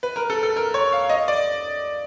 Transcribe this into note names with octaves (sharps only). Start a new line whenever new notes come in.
B4
A#4
A4
A4
A#4
C#5
F5
D#5
D5